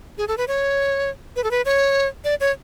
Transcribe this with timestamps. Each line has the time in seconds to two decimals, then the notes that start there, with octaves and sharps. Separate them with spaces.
0.18 G#4
0.28 A4
0.38 B4
0.48 C#5
1.36 B4
1.44 A4
1.51 B4
1.65 C#5
2.25 D5
2.41 C#5